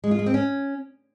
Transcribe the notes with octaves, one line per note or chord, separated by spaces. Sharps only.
G#3
F4
G#3
C4
C#4